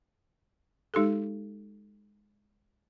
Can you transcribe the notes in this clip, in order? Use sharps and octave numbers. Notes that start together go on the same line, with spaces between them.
G#3 D#4 G4 A4